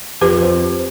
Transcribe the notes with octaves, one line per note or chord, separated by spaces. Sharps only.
F2 G4 B4
C4